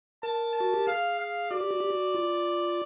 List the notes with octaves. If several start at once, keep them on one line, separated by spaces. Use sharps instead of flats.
A#4 A5
A5
F#4
G4
G#4 F5
F5
F#4 D5
G4
F#4
G4
F#4
F4